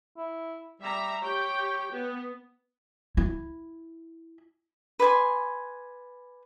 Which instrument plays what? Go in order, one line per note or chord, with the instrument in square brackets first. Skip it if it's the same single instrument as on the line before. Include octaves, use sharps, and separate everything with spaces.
[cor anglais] E4
[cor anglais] G3 [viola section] E5 A#5
[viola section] G4 G5 [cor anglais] C#5
[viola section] B3
[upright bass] E4
[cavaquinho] B4 D5 G#5 C6